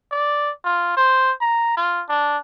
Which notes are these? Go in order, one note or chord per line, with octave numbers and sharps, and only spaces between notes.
D5
F4
C5
A#5
F4
D4